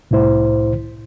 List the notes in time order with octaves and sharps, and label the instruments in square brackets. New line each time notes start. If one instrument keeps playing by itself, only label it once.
[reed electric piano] C2 A2 E4 C5